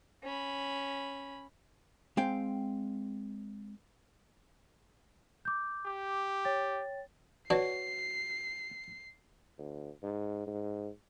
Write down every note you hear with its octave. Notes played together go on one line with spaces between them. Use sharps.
C#4 B5
G#3 C4 F5 G5
D6 G6
G4
C#5 G5 A6
D4 F#4 B4 C#5 C7
D2
G#2
G#2